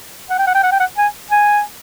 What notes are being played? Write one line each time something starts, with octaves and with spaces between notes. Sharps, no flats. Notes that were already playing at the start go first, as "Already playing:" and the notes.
F#5
G5
F#5
G5
F#5
G5
F#5
G#5
G#5